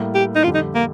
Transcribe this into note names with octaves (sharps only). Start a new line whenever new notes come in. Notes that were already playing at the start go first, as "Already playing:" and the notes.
Already playing: A2 G3 A#3
G4
D#4
F2 D3 G3 D4 F4 G4
D#4
A#3